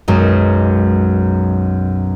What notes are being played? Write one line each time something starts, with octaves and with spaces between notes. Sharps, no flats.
B1 F#2 G#3